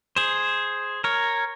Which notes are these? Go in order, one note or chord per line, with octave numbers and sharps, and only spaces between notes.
G#4 C5
A#4 C#5